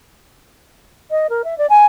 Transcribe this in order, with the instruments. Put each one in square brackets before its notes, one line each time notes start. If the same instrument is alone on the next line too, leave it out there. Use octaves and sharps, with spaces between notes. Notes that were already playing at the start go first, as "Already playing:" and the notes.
[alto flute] D#5
A#4
E5
D5
G#5